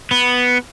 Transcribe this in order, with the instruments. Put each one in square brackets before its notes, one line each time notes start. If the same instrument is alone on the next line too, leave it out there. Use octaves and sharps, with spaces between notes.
[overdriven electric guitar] B3